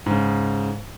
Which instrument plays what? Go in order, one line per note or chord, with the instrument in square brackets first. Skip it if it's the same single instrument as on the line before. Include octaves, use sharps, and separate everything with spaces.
[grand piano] G#2 C#3